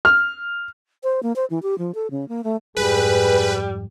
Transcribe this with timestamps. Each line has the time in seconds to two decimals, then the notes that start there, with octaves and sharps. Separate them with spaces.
0.05 F6
1.04 C5
1.23 A#3
1.36 C5
1.50 E3
1.63 G4
1.78 F3
1.95 A4
2.11 C#3
2.28 A#3
2.44 A3
2.77 F2 G#2 G3 G#4 B4